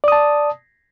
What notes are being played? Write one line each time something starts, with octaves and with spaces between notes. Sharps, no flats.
D5 A5 D#6